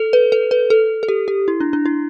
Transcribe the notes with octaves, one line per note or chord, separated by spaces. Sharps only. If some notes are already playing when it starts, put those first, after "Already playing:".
Already playing: A4
B4
A4
B4
A4
A4
G4
G4
E4
D4
D4
E4